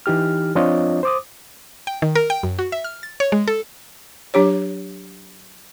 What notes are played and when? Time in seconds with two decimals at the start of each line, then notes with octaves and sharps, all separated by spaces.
0.06 E3 D#4 G4 F6
0.55 F3 C4 D4 F4 C#5 D#5
1.03 C5 D6 D#6
1.87 G5
2.02 D#3
2.15 A#4
2.30 G5
2.43 F#2
2.59 F#4
2.72 E5
2.84 F6
3.03 A6
3.20 C#5
3.32 G#3
3.48 A4
4.34 F#3 D4 G4 C#5